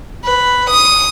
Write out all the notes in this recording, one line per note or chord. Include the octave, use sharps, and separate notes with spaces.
B4
D#6